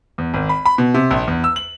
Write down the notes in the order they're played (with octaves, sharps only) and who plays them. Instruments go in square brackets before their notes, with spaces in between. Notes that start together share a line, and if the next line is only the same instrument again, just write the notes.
[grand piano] E2
G#1
B5
B5
B2
C3
A#1
E2
E6
F#7